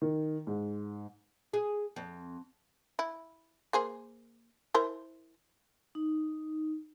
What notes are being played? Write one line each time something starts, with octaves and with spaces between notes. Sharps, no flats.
D#3
G#2
G#4
F2
E4
A#3 G#4 C5
E4 A#4 C5
D#4